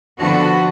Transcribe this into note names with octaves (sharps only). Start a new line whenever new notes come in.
D3 F3 B3 F#4